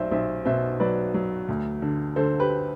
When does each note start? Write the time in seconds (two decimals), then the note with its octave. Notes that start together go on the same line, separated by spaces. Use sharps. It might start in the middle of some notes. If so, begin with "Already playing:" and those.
Already playing: B1 F#3 C5 D5 E5
0.11 B1 C5 E5
0.45 B2 C5 E5
0.80 F#3 B4 D5
1.14 F#3
1.48 D2
1.82 D3
2.16 D3 A4 C5
2.39 G4 B4